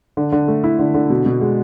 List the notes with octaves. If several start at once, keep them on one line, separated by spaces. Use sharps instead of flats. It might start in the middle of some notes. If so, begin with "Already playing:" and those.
D3
D3
A3
E4
D3
D3
B2
B2
G#3